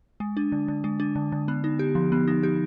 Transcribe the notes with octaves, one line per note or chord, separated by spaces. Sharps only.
G#3
D4
D3
D3
G#3
D4
D3
D3
B3
D#4
G4
F3
B3
D#4
G4